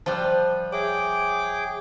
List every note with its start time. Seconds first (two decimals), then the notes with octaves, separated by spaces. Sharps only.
0.06 F3 G3 A5 F#6
0.73 G#4 C#5 E5 G5 D6